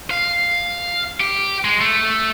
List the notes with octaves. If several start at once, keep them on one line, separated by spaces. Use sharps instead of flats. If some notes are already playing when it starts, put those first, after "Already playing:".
F5
G4
G#3
A3